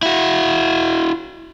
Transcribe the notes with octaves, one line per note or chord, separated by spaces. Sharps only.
E4 F#4